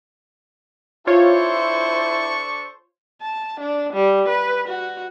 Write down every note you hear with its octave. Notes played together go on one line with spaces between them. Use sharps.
D4 E4 F4 A4 C5 C#5 C#6
A5
D4
G3
B4
F#4